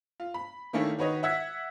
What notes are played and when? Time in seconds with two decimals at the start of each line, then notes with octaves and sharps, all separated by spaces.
0.20 F4
0.34 B5
0.73 D#3 A3 A#3 C#4 D4 E4
0.98 D#3 F#4 B4 C#5 D#5
1.23 E5 F#5 E6 G#6 B6